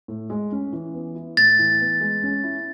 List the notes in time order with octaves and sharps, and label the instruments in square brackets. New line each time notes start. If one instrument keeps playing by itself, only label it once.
[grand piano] A2
G#3
C#4
E3
B3
E4
[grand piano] A2 [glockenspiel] A6
[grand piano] E3
B3
G#3
C#4
E4